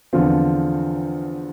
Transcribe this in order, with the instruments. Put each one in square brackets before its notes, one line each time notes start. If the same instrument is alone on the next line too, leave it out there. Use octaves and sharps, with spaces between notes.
[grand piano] E2 D3 F3 C4 F4